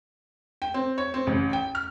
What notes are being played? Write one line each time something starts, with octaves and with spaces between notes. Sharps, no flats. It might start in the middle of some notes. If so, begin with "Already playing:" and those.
G5
C4
C#5
C4
A1
G5
F6